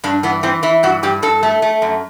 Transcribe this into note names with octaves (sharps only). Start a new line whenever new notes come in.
G2 D4
E3 B3
E3 C4
E3 E4
G2 F#4
G2 G4
G2 A4
A3
A3
F#2